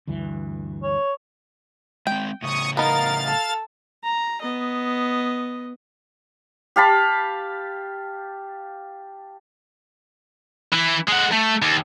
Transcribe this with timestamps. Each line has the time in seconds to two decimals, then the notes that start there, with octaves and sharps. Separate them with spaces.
0.07 D2 G2 E3
0.83 C#5
2.07 G#3 C4 G5
2.42 A2 C#3 C#6 D#6
2.77 B3 D#4 A#4 F5 A6
3.26 A4
4.04 A#5
4.42 B3 D#5
6.76 G4 F5 A5 B5
10.73 E3 E4
11.08 G#3 F#5
11.33 A3
11.62 D#2